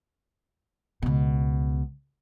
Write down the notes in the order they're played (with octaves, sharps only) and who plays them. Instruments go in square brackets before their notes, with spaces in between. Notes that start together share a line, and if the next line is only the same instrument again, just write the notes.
[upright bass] C#2 B2